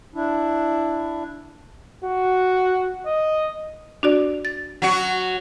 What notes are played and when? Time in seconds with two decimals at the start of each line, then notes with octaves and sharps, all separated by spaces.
0.15 D4 E4
2.05 F#4
3.06 D#5
4.03 D4 F#4 D5
4.45 A6
4.82 F#3 F#4